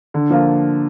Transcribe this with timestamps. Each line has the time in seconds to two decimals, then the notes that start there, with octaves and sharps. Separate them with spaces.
0.14 D3
0.30 F3 A#3 F4